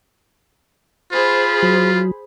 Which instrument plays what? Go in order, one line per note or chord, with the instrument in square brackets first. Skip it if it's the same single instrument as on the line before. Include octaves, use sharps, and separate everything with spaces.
[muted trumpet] F4 [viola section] G#4 C5 B5
[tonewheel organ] F#3